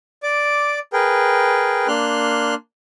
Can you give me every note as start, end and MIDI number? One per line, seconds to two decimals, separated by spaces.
0.23 0.79 74
0.23 0.79 86
0.93 1.87 68
0.93 1.87 70
0.93 1.87 71
0.93 1.87 79
1.88 2.54 58
1.88 2.54 62
1.88 2.54 84
1.88 2.54 89
1.88 2.54 90